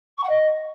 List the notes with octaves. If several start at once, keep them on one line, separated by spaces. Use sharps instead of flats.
C#6
F#5
D#5